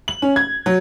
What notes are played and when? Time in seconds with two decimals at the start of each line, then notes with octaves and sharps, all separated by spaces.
0.08 F#7
0.22 C#4
0.36 G#6
0.66 F#3